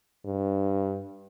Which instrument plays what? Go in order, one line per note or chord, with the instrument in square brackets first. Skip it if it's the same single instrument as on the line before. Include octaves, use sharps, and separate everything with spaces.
[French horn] G2